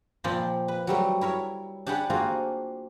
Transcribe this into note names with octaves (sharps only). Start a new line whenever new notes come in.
A#2 F3 C4 D5 G5 B5
B4
F#3 G3 A3
E4 A#4 C#5
D4 G4 G#4 F#5 B5
A3 A#3 C4 F4 F#4 G#4